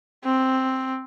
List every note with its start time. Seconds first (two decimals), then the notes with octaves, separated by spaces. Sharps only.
0.25 C4